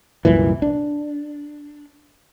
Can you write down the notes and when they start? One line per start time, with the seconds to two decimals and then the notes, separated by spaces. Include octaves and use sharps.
0.25 C2 F#2 A#2 E3
0.62 D4